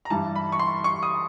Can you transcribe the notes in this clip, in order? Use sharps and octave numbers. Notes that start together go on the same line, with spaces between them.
A#5
G2 E3 G3 A5
B5
C#6
C6
C#6
D#6